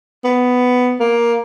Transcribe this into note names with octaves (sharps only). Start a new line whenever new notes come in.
B3
A#3